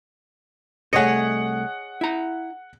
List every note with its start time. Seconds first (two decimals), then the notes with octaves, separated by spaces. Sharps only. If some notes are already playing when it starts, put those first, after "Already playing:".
0.93 C2 A3 G#4 C#5 D#5 F#5 C#7
2.01 E4 A#5